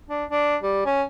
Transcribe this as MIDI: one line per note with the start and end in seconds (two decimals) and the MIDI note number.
0.10 0.24 62
0.30 0.56 62
0.63 0.84 55
0.86 1.03 61